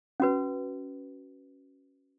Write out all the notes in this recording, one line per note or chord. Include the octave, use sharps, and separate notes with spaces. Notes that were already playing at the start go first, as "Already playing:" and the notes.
C#4 F#4 B4